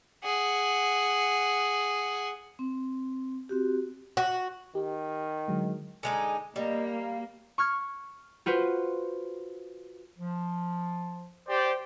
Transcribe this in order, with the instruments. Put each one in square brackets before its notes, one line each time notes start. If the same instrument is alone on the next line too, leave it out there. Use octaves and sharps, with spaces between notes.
[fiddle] G#4 F#5
[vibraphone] C4
C4 F#4 G4
[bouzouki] F#4
[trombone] D#3 [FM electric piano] G4
[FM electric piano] D3 F#3 G#3
[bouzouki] D3 G#3 D#4 [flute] G#5
[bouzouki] G3 [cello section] A#3 [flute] D#5
[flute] F5
[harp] C#6 F6 G#6
F4 F#4 B4 C5
[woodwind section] F3
[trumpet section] G4 C5 D5